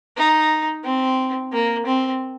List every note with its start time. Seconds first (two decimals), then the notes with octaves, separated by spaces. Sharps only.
0.17 D#4
0.84 C4
1.52 A#3
1.86 C4